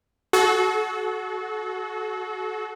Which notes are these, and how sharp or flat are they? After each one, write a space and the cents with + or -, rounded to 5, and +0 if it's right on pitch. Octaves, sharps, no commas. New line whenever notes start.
F#4 +0 A4 -35